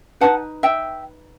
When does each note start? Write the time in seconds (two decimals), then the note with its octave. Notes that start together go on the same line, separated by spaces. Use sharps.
0.21 D#4 G4 B4 F#5 A5
0.63 E5 G5